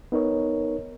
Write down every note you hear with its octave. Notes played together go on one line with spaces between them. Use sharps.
B3 D#4 A#4 C#5